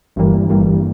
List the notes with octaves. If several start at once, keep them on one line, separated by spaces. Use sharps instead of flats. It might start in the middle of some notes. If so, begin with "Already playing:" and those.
G1 G2 E3 G3 A#3
G1 G2 E3 G3 A#3